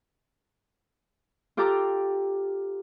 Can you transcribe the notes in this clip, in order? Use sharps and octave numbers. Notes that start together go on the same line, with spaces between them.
F4 G4 A4 G5 A#5 D6